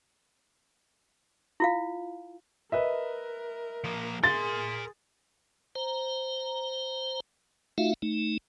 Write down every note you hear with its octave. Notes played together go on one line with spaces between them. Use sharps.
E4 F4 F5
A#4 B4 D#5 E5
F3 A#3
G#4 A#4 C6 A6
C5 A#5
A3 D#4 F4 F#4 E5 F5
A3 D#4